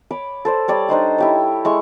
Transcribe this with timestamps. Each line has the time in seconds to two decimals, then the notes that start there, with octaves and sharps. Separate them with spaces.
0.11 C#5 B5 D6
0.45 A4 C5 D5
0.68 G3 C#5 D5
0.88 D4 D#4 C5 D#5
1.18 E4 G4 C#5
1.65 G#3 E4 C#6